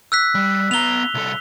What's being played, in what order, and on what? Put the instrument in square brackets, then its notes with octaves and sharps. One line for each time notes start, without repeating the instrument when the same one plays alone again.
[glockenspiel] E6 F#6 B6
[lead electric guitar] G3
[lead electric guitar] B3 A#5 [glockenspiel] F7 G7
[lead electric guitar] C2 A4